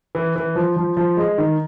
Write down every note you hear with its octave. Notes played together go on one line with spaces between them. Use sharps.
E3
E3
F3
F3
F3
G#3
D#3